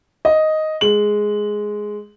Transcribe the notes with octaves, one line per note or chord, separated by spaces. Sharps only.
D#5
G#3 F#7